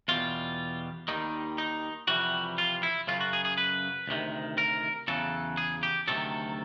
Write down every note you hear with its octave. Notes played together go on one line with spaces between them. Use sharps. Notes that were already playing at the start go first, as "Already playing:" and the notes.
E2 B2 G3 F4
D#2 D#3 G3 D#4
D#4
F2 C3 E3 G3 F#4
F4
E4
F#2 C#3 F#3 F4
F#4
G#4
G#4
B4
D2 C3 D#3
A#4
E2 C#3 F#3 A4
G#4
G4
D2 C3 D#3 F#3 A4